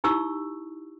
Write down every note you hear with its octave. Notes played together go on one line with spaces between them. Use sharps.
D#4 E4 G4 C#6 E6